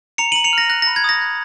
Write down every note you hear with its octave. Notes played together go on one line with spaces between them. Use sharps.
A#5 C#7 F7
D#7 F#7
A#5
C#7 F7
F6 A#6
F#6 A#6
A#6
B5
G#6
D#6 A#6
F#6